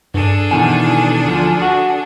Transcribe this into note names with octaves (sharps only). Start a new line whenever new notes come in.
G2 D4 G#4 A4
B2 D#3 E3 G#5
D2 F3
F#4